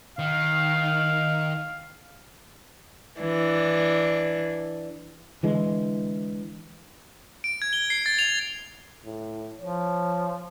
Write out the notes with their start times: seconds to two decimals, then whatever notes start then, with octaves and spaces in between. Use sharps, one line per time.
0.19 D#3 F5
3.20 E3 D4
5.43 D3 E3 G#3
7.44 D7
7.62 G#6
7.73 G7
7.90 C7
8.06 A6
8.19 F7
9.05 A2
9.61 F3 C#5